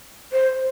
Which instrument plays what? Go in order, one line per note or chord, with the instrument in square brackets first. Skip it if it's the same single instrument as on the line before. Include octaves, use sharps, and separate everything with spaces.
[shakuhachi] C5